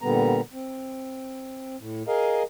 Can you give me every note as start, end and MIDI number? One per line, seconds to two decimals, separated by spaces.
0.02 0.41 46
0.02 0.41 50
0.02 0.41 55
0.02 0.41 59
0.02 0.41 82
0.53 1.76 60
1.80 2.03 45
2.08 2.43 68
2.08 2.43 70
2.08 2.43 75
2.08 2.43 77